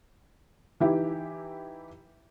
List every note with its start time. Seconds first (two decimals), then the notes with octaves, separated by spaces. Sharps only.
0.80 E3 D#4 E4 G4